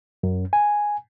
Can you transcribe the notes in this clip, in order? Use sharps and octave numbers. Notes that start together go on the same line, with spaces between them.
F#2
G#5